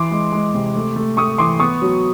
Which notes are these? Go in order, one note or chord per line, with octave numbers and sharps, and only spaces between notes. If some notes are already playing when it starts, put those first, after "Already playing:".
Already playing: E3 C6 D6
G#3
G#3
C3
A3
A3
A3 C#6 D#6
E3 C6 D6
B3 C#6 D#6
F#3